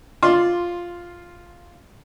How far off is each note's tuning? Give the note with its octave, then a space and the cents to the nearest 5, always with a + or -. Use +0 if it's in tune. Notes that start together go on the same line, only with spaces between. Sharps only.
F4 +0 D5 -5 C6 +10